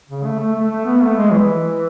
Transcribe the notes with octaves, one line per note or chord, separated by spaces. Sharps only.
C#3
A3
A3
A3
A3
B3
A3
G#3
E3